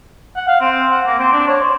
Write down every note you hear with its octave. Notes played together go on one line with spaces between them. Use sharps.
F#5
F5
C4
F#5
A#3
C4
D4
C#5
C5